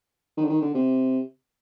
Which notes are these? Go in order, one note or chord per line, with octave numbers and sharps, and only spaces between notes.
D#3
D3
D#3
D3
C3